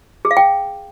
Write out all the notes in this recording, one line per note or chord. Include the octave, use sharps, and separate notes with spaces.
G#4
F5
G5